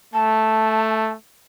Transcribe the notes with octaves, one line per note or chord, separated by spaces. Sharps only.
A3 A5